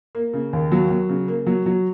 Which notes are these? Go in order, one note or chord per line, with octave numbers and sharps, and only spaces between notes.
A#3
C#3
D#2
F#3
F#3
C#3
A#3
F#3
F#3